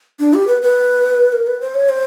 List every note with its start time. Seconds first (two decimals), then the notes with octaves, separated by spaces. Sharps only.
0.20 D4
0.34 G4
0.48 B4
0.62 B4
1.33 A#4
1.47 B4
1.61 C5
1.75 C#5
1.89 C5